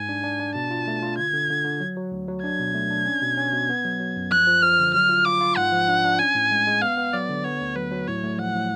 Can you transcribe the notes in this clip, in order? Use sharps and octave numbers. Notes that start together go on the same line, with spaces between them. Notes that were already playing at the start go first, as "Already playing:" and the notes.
Already playing: G#2 G#5
D4
D4
D4
B2 A5
F4
A3
F4
D3 G#6
D3
D3
D3
F#3
F#3
D2
F#3
D4 G#6
B2
A3
D4
C#4
B2
C#4
B2
B3
F#3
F#3
F#2
F3 F#6
F3
F3 F6
D3
F#3 F6
F4
F4 D6
F4
G#2 F#5
F3
D4
D4
C#4 G#5
A2
G#3
G#3
B3 F5
B3
F#3 D5
D3
B3 C#5
D2
F#3 B4
F#3
A2 C#5
A3
F3 F#5
A2